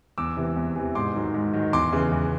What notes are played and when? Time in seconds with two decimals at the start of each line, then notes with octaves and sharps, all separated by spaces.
0.18 E2 D6 E6
0.37 C3 E3
0.56 E2
0.76 C3 E3
0.95 G#2 C6 D6
1.15 D#3 F#3
1.34 G#2
1.54 D#3 F#3
1.73 E2 C6 D6
1.93 C#3 E3
2.12 E2